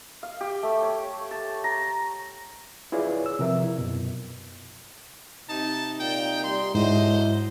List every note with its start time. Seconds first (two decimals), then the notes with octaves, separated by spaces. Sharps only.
0.23 F5
0.41 G4
0.63 A3
0.82 C#5
1.31 A5
1.64 A#5
2.92 E4 F4 G#4 B4 C#5 D5
3.26 E6
3.39 C3 F3 A#4 E5
3.63 E4
3.78 F#2 B2
5.49 C3 D#4 A5
6.00 A#2 G5
6.44 G3 C6
6.75 D2 G#2 F#3 E4 C5 D#5